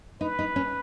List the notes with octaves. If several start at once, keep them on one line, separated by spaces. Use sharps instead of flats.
D#4 B4
D#4
C#4